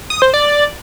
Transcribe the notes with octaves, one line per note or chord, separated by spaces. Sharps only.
D#6
C5
D5